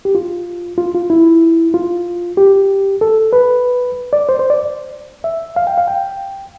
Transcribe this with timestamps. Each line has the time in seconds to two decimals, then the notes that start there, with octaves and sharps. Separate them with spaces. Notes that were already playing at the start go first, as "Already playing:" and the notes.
0.05 G4
0.15 F4
0.78 F4
0.95 F4
1.10 E4
1.74 F4
2.37 G4
3.01 A4
3.33 B4
4.13 D5
4.29 C5
4.39 C5
4.50 D5
5.24 E5
5.56 F5
5.67 G5
5.78 F5
5.88 G5